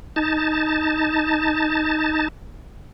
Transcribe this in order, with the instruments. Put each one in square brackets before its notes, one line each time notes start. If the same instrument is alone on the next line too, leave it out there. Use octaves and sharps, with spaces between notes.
[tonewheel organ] D#4 A5